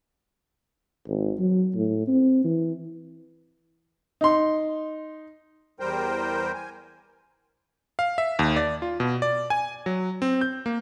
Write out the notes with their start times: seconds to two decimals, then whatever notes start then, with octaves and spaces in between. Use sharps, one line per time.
1.07 G#1
1.39 F#3
1.75 A2
2.08 C4
2.44 E3
4.21 D#4 C6
5.80 E2 G3 A#4 C5 G5
6.54 G#5
7.99 F5
8.18 E5
8.39 D#2
8.56 D5
8.82 F4
9.00 B2
9.22 D5
9.50 G#5
9.86 F#3
10.22 C4
10.41 G6
10.66 A#3